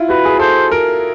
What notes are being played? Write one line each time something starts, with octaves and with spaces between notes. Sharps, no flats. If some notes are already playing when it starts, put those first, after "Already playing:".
Already playing: E4 F4
F#4 B4
G#4
A4 C5
A#4